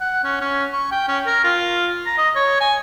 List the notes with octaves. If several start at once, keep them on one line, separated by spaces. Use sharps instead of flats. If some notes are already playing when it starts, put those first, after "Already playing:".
F#5
C#4
C#4
C#6
G5
C#4
A#4
F4
A#5
D#5
C#5
G#5